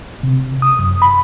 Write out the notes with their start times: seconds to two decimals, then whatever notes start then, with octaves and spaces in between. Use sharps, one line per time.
0.23 C3
0.62 D#6
0.79 F#2
1.02 B5